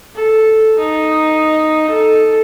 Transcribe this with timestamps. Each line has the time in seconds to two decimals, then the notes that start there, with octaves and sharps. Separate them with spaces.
0.15 A4
0.78 D#4
1.90 A4